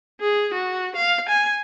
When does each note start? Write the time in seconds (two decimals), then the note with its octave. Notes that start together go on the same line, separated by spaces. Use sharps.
0.21 G#4
0.54 F#4
0.96 F5
1.29 G#5